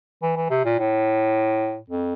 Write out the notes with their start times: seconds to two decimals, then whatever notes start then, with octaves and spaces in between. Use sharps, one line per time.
0.22 E3
0.36 E3
0.50 C3
0.65 A#2
0.79 A2
1.90 F2